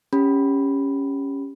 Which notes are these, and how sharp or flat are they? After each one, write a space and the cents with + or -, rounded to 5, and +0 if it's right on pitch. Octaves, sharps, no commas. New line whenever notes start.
C#4 +0 G4 +20 B5 +0